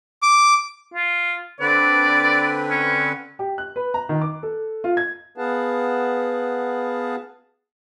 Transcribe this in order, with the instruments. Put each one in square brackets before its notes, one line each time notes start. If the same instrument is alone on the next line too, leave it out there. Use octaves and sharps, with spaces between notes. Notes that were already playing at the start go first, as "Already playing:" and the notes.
[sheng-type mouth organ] D6
[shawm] F4
[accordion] D3 C4 B4 [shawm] D5
[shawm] C#4
[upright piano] G4
F#6
B4
A#5
D#3
D6
A4
F4
G#6
[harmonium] B3 G#4 B4 F5 F#5 A5